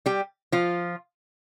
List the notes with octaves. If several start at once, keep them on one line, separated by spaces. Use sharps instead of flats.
G3 G4
F3 F4